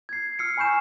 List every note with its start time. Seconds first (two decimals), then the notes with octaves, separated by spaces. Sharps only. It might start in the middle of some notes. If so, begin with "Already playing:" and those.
0.09 G#6 C7
0.39 E6 F6 C7 C#7
0.57 G#5 B5 C#6 G6 E7